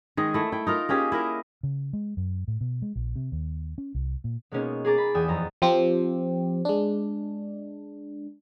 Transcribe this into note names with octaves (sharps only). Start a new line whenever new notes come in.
D#3 G#3 G#4
A3 E4
E4 G5
D#4 F4 A#4
A#3 C#4 G4 G#4
E4 A#4 D#5
C#3
G#3
F#2
A2
B2
G#3
A#1
C3
D#2
C#4
C2
A#2
B2 G#3 A#3 B3 C#4 D#4
G#4 A#5 D6 A6
B5
E2 G5 G#5 D#6 E7
F2 A#5 A6
F3 C4 G4
G#3 D4